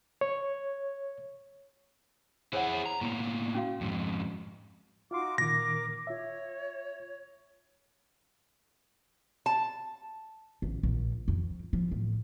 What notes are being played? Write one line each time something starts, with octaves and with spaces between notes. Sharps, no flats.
C#5
E4 G#4 C5 C#5 F#5
A#5
A2 A#3
C#4 F#4 F5
F2 G#2
D#4 F4 F#4 F5 C6 D6
A#2 D#3 A#4 D6 A#6
F4 C#5 E5
A5
A1
A#1
F2
F3
A2